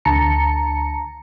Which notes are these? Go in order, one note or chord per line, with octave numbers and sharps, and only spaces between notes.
D2 D3 A5 A#5 C#7